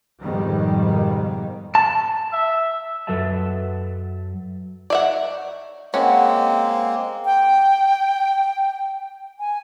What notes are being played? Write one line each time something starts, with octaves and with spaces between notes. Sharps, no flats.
F2 G#2 B2 D#3 G3
A5
E5
F#2 F#3 A4 B4 E5 A5
D#4 C#5 D5 E5 F#5 A5
G#3 A#3 C4 C#4 F#4 F#5 A5
G5
G#5